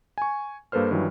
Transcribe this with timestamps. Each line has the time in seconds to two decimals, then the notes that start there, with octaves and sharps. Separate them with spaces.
0.18 G#5 C#6
0.72 G2 A#3 A4 B4 C5 F6
0.91 G2 D#3 E3 F#3